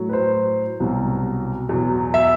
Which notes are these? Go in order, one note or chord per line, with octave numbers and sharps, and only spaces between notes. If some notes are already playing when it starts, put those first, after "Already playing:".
Already playing: A2 F#3
B4
C5
C2 B2 F#3
E2 B2 F#3
E5